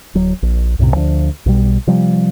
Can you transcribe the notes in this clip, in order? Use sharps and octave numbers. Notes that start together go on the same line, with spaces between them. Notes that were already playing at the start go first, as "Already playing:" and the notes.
D1 F#3
A#1
C2 F#2 A2 C3
D2 F3 C#4 D4
B1 B2 G3
C3 F3 G3